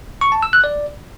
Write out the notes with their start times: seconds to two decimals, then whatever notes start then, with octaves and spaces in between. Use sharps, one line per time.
0.21 C#6
0.32 A5
0.43 E6
0.53 F#6
0.64 D5